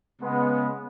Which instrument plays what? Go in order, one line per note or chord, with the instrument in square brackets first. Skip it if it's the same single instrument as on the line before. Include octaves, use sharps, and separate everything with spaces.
[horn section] C#3 G#3 B3